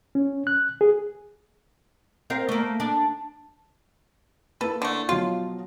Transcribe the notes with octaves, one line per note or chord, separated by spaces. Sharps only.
C#4
F#6
G#4
C4 A#4 F5
A3 A#3
D4
A#3 E4 A4 B4
D3 A3
B2 F3 F#3 F4